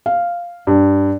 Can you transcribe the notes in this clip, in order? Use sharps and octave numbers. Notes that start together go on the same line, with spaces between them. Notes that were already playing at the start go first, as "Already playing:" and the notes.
F5
G2